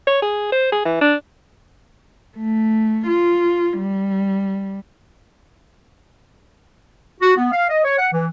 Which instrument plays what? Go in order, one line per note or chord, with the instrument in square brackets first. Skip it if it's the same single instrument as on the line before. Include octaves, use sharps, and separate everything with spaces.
[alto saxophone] C#5
G#4
C5
G#4
E3
D4
[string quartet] A3
F4
G3
[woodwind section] F#4
B3
F5
D#5
C#5
F#5
E3